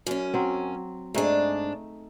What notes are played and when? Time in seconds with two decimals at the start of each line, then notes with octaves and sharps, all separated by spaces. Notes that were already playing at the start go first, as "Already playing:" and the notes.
0.07 F#2 C#4
0.34 F#3 C4
1.14 G#2 A3 D4 D#4 G#4